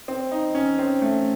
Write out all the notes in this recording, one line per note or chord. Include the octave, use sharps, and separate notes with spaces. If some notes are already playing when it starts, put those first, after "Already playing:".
C4
D#4
C#4
C4
A3